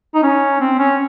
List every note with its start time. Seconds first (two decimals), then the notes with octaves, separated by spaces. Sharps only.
0.15 D#4
0.23 C#4
0.61 C4
0.79 C#4